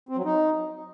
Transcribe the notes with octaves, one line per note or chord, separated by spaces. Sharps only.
C4
F#3
D#4